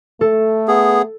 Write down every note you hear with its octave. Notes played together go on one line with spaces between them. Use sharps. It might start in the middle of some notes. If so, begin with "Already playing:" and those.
A3 A4
B3 G#4